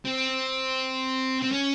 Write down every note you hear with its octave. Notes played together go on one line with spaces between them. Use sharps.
C4
C4
C#4